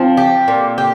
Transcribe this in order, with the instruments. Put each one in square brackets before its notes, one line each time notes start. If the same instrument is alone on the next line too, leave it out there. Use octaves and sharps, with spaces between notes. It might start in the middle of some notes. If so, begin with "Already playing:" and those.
Already playing: [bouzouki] F3 [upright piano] C4 F4
[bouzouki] G4
A#2
G4